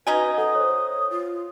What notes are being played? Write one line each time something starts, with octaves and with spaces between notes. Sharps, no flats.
C#4 D#4 F#4 B4 G#5
A4 F#5 D#6
C5 C#5
F4